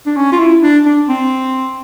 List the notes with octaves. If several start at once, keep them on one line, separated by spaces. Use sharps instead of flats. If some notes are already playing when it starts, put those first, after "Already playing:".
D4
C#4
F4
E4
D4
D4
C4